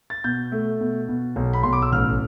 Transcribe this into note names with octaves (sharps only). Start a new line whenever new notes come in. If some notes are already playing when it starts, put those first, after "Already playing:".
A6
B2 G6
A3
B2
B2
B1
B5
B1 C6
D6
E6
A1 F6